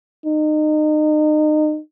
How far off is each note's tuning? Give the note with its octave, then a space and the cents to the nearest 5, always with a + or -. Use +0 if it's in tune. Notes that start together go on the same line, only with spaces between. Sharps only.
D#4 -30